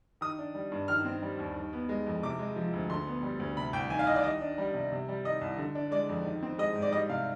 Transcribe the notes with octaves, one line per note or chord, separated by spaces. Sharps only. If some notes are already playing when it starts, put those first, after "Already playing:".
D#3 D#6
D4
G3
G2
D#3 F6
C4
G3
D#2
D#3
B3
G#3
F2
C3 D6
G#3
F3
D2
D3 C6
B3
G3
D2
C3 B5
C2 G5
D#3 G#5
F5
C2 D#5
D5
D#3 D#5
D4
G3
C3
C3
G3
D#3 D#5
C2
D3
D4
G#3 D5
F2
D#3
C4
G#3 D#5
G#2
D5
G3 D#5
C3 F5